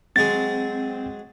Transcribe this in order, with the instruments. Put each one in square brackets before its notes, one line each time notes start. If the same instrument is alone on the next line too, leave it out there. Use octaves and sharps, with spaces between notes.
[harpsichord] F#3 G#3 G#4 [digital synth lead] C4 [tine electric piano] A6